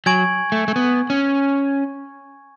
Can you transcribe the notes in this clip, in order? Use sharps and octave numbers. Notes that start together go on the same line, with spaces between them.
F#3 G#5 C#6 G#6 D7 F#7
A3
A3
B3
C#4